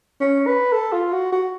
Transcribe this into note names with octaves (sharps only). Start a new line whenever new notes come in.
C#4
B4
A4
F4
F#4
F#4